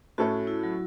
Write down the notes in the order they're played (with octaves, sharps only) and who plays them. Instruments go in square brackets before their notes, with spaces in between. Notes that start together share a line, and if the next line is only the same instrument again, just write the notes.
[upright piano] A2 A3 C#4 A4 [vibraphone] F#4
[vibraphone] E4
F#3